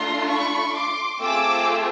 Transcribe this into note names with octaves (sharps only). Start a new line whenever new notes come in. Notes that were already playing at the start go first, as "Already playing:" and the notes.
Already playing: A3 D4 F4 A#5 C6
B5 C#6
C6 D6
A3 C4 F4 G#4 D6 E6